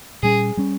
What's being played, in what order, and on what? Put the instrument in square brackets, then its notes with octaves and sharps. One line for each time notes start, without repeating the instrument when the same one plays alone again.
[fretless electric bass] A#2 G3 C#4 [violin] G#4
[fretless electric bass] G3 A#3 C#4